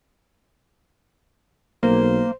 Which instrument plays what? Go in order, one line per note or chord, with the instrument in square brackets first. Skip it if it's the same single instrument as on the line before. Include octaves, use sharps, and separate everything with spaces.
[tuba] B1 [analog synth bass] A#3 [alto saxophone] C5